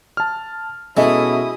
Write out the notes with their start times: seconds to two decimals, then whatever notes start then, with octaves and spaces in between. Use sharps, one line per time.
0.17 A5 F6
0.97 B2 G#3 C#4 E4 F#4 A4 E5 D#6